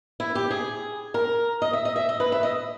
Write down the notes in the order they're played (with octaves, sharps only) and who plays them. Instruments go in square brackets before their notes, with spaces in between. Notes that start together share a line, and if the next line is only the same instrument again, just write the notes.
[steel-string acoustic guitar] E4
G4
G#4
A#4
D#5
E5
D#5
E5
D#5
B4
E5
D#5